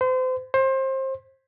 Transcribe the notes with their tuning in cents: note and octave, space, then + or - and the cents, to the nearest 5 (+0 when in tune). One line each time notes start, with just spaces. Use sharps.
C5 -35
C5 +25